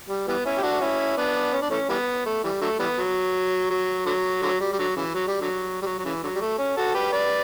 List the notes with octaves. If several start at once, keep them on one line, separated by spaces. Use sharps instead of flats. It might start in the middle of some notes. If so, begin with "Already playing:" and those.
G3
E3 G3 B3
C#4 E4
G4
D4 F#4
C#4 E4
B3 D4
C#4
D4
E3 A3 C#4
E3 G3 B3
A3
E3 G3
D3 F#3 A3
E3 G3 B3
F#3
F#3
D3 F#3
D3 F#3
G3
G3
D3 F#3
C#3 E3
F#3
G3
D3 F#3
G3
F#3
F#3
C#3 E3
D3 F#3
G3
A3
C#4
F#4 A4
G4 B4
B4 D5